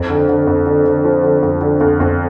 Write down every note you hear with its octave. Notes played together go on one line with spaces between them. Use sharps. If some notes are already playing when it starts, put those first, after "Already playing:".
Already playing: F2
D3
D3
F2
D3
D3
F3
D3
F2
D3
F2
F2